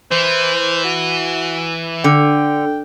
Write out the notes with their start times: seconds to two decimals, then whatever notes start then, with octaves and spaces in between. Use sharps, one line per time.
0.11 E3 C5
0.84 F#4
2.04 D3 G5